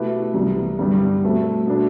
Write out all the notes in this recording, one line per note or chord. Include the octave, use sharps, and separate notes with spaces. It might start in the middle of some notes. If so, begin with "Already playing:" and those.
Already playing: B2 A3 E4 G4 B4
C2 C3 E3 B3
G2 D3 G3 B3
B2 A3 C4
B2 A3 D4